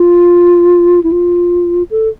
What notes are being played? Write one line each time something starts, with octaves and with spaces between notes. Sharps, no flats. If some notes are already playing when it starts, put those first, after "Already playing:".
Already playing: F4
E4
F4
A4